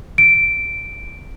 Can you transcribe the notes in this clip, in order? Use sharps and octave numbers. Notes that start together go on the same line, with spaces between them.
D7